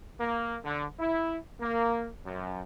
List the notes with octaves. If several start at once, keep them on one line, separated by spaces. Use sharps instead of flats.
A#3
D3
E4
A#3
F#2